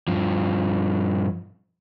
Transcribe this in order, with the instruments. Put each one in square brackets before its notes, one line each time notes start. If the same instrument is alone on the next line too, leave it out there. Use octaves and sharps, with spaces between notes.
[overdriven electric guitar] G2 F3